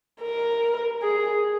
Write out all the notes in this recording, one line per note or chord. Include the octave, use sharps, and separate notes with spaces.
A#4
G#4